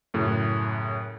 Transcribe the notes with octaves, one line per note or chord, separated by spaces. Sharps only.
F#2 A2 C#3